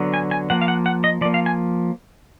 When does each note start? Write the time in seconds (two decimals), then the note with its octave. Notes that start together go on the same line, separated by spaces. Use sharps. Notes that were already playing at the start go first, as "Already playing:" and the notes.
Already playing: D3 F#3 B3
0.14 G#5
0.31 G#5
0.50 F3 A#3 F#5
0.62 F5
0.68 F#5
0.86 F#5
1.04 D#5
1.21 F3 D5
1.25 A#3
1.34 F5
1.46 G#5